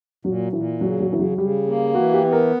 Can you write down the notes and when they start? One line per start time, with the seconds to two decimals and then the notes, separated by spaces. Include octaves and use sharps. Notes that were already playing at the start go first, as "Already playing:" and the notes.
0.25 A#2 F#3
0.52 A#2 E3
0.81 C#3 F#3
1.00 F#3
1.10 C#3 E3
1.19 F#3
1.38 C#3 G3
1.66 A#3
1.95 E3 F#4
2.14 G4
2.24 B3
2.32 A#4